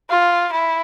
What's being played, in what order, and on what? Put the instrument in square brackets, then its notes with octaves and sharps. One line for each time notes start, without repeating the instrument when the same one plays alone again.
[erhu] F4
E4